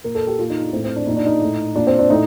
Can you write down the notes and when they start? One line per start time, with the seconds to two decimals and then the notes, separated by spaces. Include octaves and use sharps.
0.04 A#2 A#4
0.15 A4
0.27 G4
0.39 A#2 F4
0.50 D#4
0.62 D4
0.73 A2 C4
0.84 C4
0.96 D4
1.07 A#2 D#4
1.16 D4
1.26 D#4
1.41 A2
1.75 A#2 D4
1.87 C4
1.99 D4
2.10 A2 D#4